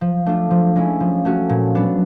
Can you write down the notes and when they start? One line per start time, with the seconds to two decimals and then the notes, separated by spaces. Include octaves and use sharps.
0.01 F3
0.26 A3 D4 F4
0.51 F3
0.76 G#3 C#4 E4
1.00 F3
1.25 A3 C#4 F#4
1.49 A#2
1.75 F#3 B3 D4